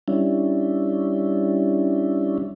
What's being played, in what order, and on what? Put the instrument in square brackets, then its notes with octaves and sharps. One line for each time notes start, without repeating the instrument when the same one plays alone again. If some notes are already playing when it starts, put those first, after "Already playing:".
[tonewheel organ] G3 C#4 D4 E4